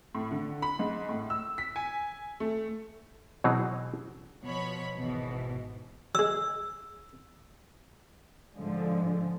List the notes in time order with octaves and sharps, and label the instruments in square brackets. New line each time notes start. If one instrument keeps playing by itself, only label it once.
[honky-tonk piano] A2
D3
B5
G#2
A2
E6
B6
G#5
A3
[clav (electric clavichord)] B2 E3 F#3 C4 D#4 G#4
[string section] B2 F3 C#5 B5
G#1 B2 E3
[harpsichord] F#3 G#3 [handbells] E6
[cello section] G#2 D3 F3 G#3